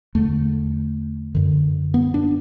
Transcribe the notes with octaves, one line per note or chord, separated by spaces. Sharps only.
E2 D3 A3
F#2 D3
B3
D4